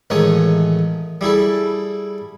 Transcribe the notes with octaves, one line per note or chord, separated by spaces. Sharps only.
A1 D#3 G#3 A3 C#5 D#6
G3 E4 G#4 A4